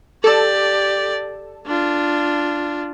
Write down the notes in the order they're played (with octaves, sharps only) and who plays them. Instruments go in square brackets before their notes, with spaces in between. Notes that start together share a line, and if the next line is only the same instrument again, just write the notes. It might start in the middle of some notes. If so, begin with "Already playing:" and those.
[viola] G4 D5 [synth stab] A4 A5
[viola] D4 F4